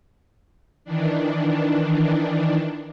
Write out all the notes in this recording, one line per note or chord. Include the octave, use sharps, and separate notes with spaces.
D#3 E3 D4